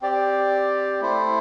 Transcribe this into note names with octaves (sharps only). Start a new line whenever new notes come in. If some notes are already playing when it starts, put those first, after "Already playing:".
C4 G4 D5
A3 E4 C5